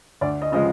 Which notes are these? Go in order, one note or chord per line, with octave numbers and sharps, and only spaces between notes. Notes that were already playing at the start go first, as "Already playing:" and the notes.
D2 D5
D#5
C#3 F3 G#3 D#5